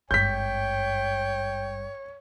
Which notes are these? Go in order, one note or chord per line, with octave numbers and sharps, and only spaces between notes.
G#1 G2 C#5 G5 G6 B6